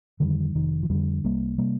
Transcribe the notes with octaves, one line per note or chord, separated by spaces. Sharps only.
F2 D3 D#3 G3
F1 D#3
F3
F2 D3 D#3 G3
C2 G3 A#3
C3 G3 A#3